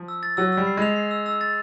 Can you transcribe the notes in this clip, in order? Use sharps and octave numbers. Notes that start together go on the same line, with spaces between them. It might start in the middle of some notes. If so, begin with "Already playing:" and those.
Already playing: F3
E6
A6
F#3 E6
E6
G3
C7
G#3 F7
C7
E6
E6
A6